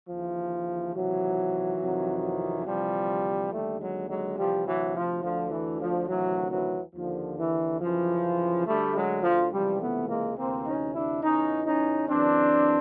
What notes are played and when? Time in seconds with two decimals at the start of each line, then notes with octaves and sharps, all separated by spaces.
0.09 D#2 C#3 E3 F3
0.94 C#2 C3 D#3 E3 F#3
1.80 F2 C3 D#3
2.66 D2 C3 E3 F3 G3
3.51 D#2 D3 G3 A3
3.80 F#3 G#3
4.09 F#3 G#3
4.38 D2 C3 E3 F3 G3
4.66 E3 F#3
4.95 F3
5.23 D2 D3 F3
5.51 E3
5.81 F3
6.09 D2 C3 D#3 E3 F#3
6.51 E3 F#3
6.95 D#2 D3 F3
7.38 E3
7.81 F#2 C#3 E3 F3
8.67 D2 D3 G3 A3
8.95 F#3 G#3
9.23 F3
9.51 C#2 C3 E3 F3 G3
9.80 A3 B3
10.09 G#3 A#3
10.38 D2 C3 E3 A#3 C4
10.66 C#4 D#4
10.95 D4 E4
11.23 E2 C#3 E3 C#4 D#4
11.66 C#4 D#4
12.09 F#2 C#3 E3 C4 D4